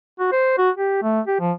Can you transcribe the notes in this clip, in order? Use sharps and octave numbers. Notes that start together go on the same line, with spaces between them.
F#4
C5
F#4
G4
A3
G4
F3